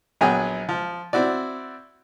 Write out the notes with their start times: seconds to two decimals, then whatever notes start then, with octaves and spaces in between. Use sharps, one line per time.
0.21 A#1 F#3 B3 G#4 G5 G#5
0.69 F3
1.13 C4 E4 F#4 D5